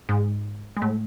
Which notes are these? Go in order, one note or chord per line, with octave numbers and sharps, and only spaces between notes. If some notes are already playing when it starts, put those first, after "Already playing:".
G#2 G#3
G#3
A2 A3